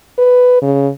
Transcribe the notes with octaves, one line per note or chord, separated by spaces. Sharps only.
B4
C#3